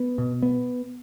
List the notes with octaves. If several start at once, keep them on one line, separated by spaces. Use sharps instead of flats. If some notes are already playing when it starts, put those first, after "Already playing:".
Already playing: B3
B2
B3